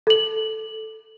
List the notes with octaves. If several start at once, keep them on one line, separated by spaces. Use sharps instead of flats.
A4 F#7